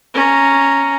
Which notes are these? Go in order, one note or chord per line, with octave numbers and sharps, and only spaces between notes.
C#4 A#5